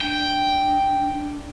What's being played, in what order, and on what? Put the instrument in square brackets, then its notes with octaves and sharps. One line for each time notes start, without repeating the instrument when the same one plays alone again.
[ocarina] D4 [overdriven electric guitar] G5
[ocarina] D4